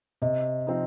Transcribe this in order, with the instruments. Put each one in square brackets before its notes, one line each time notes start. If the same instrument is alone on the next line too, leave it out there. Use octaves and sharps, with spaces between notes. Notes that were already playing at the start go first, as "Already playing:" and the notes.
[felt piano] C3 [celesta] D#5
[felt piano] F3 C4 D#4